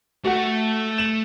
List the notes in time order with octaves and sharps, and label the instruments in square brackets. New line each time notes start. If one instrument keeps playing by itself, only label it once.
[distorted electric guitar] A3 [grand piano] F#4 F#5
[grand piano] E7 F#7